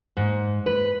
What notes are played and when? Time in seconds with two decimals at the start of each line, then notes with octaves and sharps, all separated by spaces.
0.17 G#2
0.66 B4